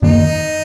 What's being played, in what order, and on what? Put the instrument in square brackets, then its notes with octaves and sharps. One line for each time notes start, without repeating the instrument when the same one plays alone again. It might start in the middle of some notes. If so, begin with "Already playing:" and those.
[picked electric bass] F#2 D#3 A#3 [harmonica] D#4